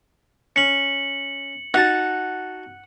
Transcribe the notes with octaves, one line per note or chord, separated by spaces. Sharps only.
C#4 C#7 F#7
D#4 F#4 F#5 A5